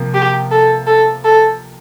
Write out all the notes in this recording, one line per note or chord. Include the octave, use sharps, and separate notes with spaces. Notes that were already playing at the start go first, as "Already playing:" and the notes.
Already playing: C3 F3 A#3
G4
A4
A4
A4